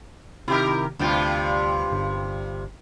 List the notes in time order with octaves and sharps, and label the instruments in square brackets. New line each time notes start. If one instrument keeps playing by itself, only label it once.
[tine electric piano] C3 D#3 [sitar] E4 G4 A#4
[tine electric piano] D2 G5 [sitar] G2 C3 F4
[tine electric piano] G1